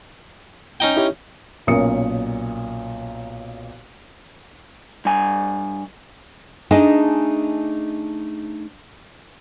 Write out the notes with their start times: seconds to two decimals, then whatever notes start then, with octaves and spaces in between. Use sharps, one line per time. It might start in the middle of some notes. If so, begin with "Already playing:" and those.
0.80 C#4 D#4 G5
0.97 E4 G4 C#5
1.67 B1 A#2 C#4 A#4 D#6 C#7
5.05 G2 G#5
6.71 A3 D4 D#4 G#4 D#5 G#5